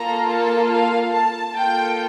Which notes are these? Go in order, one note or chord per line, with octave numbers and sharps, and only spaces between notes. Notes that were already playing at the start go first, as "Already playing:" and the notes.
Already playing: A#3 F4 A4 A#5
A5
F5
A5
A#3 F4 A4 G5